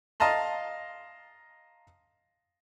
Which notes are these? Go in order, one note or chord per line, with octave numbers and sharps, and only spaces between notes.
D#5 F5 A5 A#5 C6